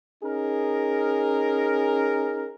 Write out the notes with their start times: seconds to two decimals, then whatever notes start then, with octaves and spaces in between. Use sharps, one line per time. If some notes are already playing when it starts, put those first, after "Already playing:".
0.24 C#4 D#4 G#4 A#4